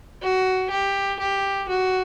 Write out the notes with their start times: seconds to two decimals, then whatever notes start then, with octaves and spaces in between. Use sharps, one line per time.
0.22 F#4
0.70 G4
1.19 G4
1.68 F#4